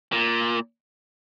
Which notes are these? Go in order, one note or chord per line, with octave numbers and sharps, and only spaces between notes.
A#2